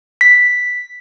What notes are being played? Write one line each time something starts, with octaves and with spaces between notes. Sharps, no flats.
B6